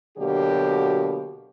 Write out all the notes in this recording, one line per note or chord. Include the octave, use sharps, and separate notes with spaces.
B2 D3 F#3 A#3 F#4 G4